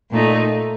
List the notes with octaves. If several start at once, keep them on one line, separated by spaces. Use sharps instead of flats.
A#2 A3 D#4